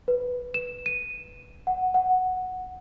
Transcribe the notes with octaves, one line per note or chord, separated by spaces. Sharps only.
B4
E7
D#7
F#5
F#5